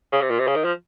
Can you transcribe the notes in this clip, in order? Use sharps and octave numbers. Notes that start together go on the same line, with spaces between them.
C#3
C3
A#2
C3
C#3
D#3
F3